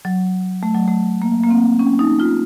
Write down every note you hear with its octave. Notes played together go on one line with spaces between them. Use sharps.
F#3
A3
F#3
A3
A#3
A#3
C4
C#4
D#4
F4